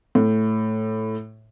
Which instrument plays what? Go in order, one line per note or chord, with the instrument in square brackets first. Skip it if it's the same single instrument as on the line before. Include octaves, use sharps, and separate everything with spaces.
[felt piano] A2